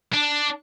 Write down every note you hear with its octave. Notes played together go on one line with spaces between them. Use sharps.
D4